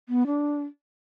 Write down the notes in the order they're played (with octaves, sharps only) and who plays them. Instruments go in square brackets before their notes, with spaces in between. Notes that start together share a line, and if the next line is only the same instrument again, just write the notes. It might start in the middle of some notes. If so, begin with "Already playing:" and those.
[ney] B3
D4